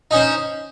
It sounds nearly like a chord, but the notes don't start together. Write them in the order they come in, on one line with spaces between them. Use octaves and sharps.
D#4 C#4 C5